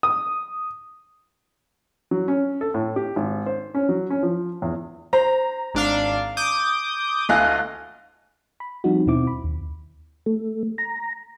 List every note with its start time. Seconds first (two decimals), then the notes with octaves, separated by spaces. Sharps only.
0.03 D#6
2.11 F#3
2.28 C#4
2.61 A4
2.74 A2
2.96 G4
3.16 G#1
3.46 C5
3.74 C#4
3.89 F#3
4.10 C#4
4.23 F3
4.62 E2
5.13 C5 A#5
5.74 G#1 D4 F5
6.37 D6 D#6 G6
7.29 D2 E4 A4 D#5 F5 G#5 F#6
8.60 B5
8.84 F3 G3 C4 D#4 F#4
9.06 D#2 B2 C4 E4 D6
9.27 B5
9.44 D#2
10.26 A3
10.78 A#5